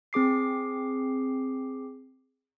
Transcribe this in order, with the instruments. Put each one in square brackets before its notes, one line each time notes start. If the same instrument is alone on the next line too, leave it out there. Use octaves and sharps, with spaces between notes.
[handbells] C4 G#4 D6 C7